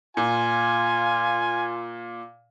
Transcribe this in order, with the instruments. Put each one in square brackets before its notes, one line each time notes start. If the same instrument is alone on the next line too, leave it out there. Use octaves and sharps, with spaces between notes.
[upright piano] A#2 [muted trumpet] F4 [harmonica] G#5